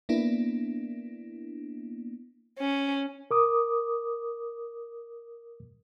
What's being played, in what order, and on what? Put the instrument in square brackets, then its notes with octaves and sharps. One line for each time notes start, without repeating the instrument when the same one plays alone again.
[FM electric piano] A#3 B3 D4 E4
[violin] C#4
[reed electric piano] A#4 D6 D#6